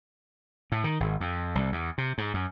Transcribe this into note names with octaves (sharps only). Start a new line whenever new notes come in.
A2
D#3
G#1
F2
C2
E2
C3
G#2
F#2